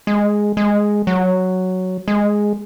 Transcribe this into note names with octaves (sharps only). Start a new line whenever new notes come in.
G#3
G#3
F#3
G#3